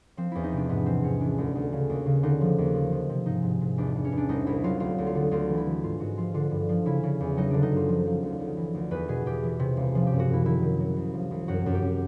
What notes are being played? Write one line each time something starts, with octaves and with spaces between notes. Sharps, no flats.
F3 C4
E2 E4
D#4
C3 D4
G#2 B3
E3 C4
G#2 C#4
E3 D4
D2
D2
C#3
D#2
C#3
D3 D#4
F3
D#2
F3
F3
C3
G#2 D#4
G#2
G#2
E2 D4
E2
C#4
E2
D4
C2 D#4
C2 E4
F#3 F4
D2 F4
D2
F4
D3
D2 F4
E3
E4
E3
G#2 F4
G#2 F#4
F3 F4
D3 F4
G2
F3
C#3 E4
C#3
E2
F#3 D#4
D3 D4
D#4
F#2 F4
F3
F3
D2
D2
E3
D2
E2 B4
B2 G#4
E2 G4
E3
C3
C#2
F3
G4
F#2
F#4
F#2 E4
D#3 E4
D#3
F#3
C2
F3
C2
F#2 F#4
F#2
G4
F#2